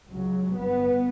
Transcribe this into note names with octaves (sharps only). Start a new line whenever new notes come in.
C#2 C#3 F#3
G1 G2 B3